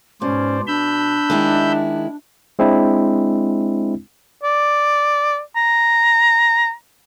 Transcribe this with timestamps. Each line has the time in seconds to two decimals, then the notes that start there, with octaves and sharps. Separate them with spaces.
0.22 G#2 B2 C#4 C5 D5
0.67 D4 B5 E6 G6
1.30 D#3 G#3 E4
2.59 G#3 C4 D4 E4
4.44 D5
5.56 A#5